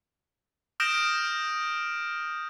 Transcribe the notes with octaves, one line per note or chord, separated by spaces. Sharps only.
D#6 F6 G6 A#6 D7 E7